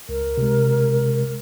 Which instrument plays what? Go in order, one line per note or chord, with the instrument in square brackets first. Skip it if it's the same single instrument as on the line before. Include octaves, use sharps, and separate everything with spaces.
[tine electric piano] C#2 [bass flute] A#4
[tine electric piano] C3 G#3